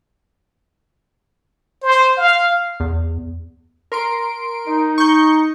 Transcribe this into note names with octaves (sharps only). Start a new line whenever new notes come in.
C5
F5
E2
A#4 C6 D7
D#4
C#6 G6